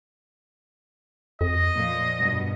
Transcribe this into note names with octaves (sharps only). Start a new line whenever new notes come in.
F2 D#5
A#2 F3
G2 B2